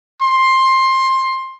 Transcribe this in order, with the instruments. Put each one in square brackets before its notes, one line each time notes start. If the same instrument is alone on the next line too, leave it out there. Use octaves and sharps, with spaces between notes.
[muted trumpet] C6